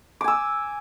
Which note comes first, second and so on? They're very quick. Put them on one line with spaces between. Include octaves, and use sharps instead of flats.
D6 G#5 E6